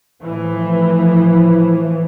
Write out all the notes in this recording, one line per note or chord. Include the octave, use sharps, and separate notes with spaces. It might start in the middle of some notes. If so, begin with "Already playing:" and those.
A2 E3 F3